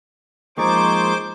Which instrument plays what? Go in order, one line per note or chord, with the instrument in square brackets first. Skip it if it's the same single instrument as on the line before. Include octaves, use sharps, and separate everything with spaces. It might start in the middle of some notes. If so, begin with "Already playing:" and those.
[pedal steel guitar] F3 G#3 A#3 [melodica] D#4 G#4 C#6 [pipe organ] C5 D6